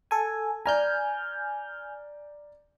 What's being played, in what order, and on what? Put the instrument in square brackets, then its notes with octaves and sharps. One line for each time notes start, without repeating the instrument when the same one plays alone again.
[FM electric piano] A4 G#5
[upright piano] D5 A#5 [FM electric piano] G#5 F6 G6